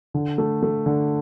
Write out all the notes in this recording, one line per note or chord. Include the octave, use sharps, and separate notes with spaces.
D3
A3
A3
D3